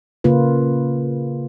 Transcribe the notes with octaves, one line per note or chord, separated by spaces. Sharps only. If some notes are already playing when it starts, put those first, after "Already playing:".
C#3 A#3 F4 B4